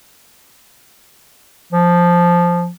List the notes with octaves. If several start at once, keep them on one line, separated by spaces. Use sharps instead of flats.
F3